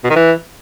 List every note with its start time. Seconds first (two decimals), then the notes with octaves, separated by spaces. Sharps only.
0.04 B2
0.10 D#3
0.16 E3